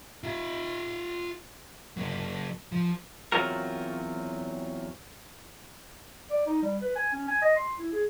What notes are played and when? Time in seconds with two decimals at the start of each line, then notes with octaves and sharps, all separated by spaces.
0.23 F4 E5
1.97 F#3 A#3
2.72 F3
3.32 E2 F#3 C4 F4 F#4 A#4
6.30 D5
6.46 D#4
6.62 G3
6.82 B4
6.96 G#5
7.13 C#4
7.28 G#5
7.42 D#5
7.56 C6
7.79 E4
7.93 G#4